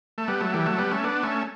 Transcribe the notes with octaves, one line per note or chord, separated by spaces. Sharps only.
A3
G3 B3
F#3 A3
E3 G3
F#3 A3
G3 B3
A3 C#4
B3 D4
A3 C#4